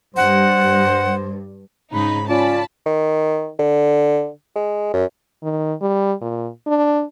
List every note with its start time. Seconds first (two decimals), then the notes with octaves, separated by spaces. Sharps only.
0.17 G2 C5 F#5
1.93 G#2 C#3 D#4 B5
2.29 C#4 F4 D5 A5 B5
2.86 D#3
3.59 D3
4.56 G#3
4.94 F#2
5.43 D#3
5.81 G3
6.21 A#2
6.67 D4